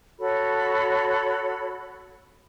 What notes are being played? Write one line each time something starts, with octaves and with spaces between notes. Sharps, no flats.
F#4 A4 C#5 B5